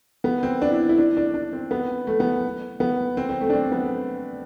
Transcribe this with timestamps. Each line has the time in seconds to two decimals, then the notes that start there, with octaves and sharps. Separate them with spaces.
0.24 B3
0.43 C4
0.62 D4
0.71 E4
0.89 E4
0.98 D4
1.17 D4
1.34 D4
1.53 C4
1.71 B3
2.07 A3
2.20 B3
2.80 B3
3.17 C4
3.29 C4
3.41 A3
3.50 D4
3.53 C4
3.72 B3